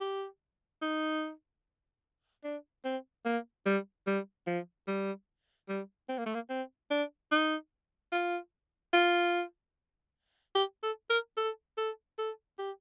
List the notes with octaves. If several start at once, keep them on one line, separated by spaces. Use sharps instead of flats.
G4
D#4
D4
C4
A#3
G3
G3
F3
G3
G3
C4
A#3
A3
A#3
C4
D4
D#4
F4
F4
G4
A4
A#4
A4
A4
A4
G4